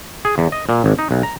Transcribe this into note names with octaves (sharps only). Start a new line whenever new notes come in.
G#4
E2
D#5
A#2
G#1
D#4
B1
A#5